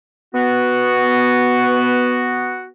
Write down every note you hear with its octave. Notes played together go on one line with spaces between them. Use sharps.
B3 F#4